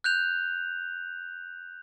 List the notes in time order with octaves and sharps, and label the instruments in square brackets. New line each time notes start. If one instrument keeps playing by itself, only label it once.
[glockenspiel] F#6 G6 F7